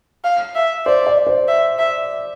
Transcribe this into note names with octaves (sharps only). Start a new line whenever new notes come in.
F5
E5
C5 D5
D5
C5
E5
E5